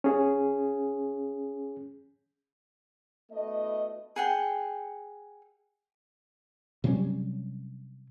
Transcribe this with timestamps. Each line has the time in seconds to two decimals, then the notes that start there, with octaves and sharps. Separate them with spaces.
0.04 C#4 G#4
3.32 A3 B3 D4 E4 F#4 D#5
4.16 G#4 F#5 G5
6.84 C3 F#3 G3 C#4